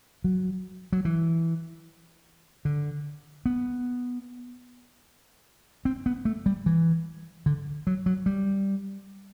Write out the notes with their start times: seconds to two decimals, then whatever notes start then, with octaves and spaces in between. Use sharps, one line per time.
0.24 F#3
0.92 F#3
1.05 E3
2.65 D3
3.46 B3
5.85 C4
6.06 B3
6.25 A3
6.46 G3
6.66 E3
7.46 D3
7.87 F#3
8.06 F#3
8.26 G3